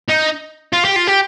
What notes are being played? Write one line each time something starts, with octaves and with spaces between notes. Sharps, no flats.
D#4
F4
G4
F4
G4